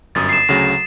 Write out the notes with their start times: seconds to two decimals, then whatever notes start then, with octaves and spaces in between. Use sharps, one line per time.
0.15 G1 F#2 D#6 A6
0.29 C7 E7
0.49 D2 C#3 F#3